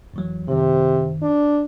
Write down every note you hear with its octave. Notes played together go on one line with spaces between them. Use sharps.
F2 E3 F#3
F#2 C3 D#3
D4